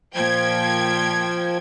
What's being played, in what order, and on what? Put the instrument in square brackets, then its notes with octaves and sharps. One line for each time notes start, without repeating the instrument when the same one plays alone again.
[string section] A#2 G5 G#6 [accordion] F3